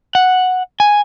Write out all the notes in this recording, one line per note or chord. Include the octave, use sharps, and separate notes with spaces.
F#5
G#5